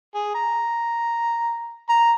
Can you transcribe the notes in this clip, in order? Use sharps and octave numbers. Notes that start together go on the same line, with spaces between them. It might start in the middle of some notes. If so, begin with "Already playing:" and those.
G#4
A#5
A#5